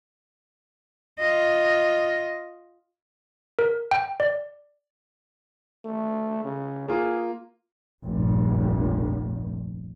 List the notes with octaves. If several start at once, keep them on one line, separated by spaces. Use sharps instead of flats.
F4 D#5
A#4
G5
D5
A3
C#3
A#3 F4 G#4
F1 A#1 G2